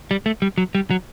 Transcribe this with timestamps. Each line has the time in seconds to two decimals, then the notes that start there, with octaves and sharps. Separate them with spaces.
0.11 G3
0.26 A3
0.42 G3
0.58 F#3
0.75 G3
0.91 F#3